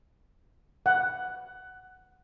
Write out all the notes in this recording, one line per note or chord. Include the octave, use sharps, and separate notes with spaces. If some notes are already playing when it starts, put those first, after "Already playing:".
F#5